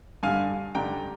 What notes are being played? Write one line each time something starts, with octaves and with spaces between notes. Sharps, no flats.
G2 D3 G3 F5 G#5
G2 D3 G3 G5 A#5